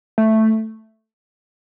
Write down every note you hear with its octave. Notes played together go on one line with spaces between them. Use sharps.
A3